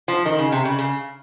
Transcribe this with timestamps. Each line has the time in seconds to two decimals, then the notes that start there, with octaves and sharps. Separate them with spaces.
0.08 F3
0.26 D#3
0.39 C#3
0.52 C3
0.65 C#3
0.79 C#3